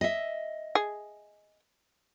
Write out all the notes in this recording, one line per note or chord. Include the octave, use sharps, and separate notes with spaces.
D#5 E5
G#4